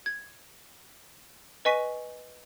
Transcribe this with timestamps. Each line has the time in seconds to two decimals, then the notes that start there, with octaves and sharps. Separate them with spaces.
0.06 G#6
1.65 B4 D#5 G#5 C#6 B6 D#7